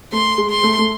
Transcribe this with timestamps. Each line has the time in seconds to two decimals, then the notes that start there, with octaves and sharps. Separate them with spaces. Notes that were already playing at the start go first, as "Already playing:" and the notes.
0.12 A3 C6
0.38 G#3
0.50 C6
0.63 A3
0.78 A3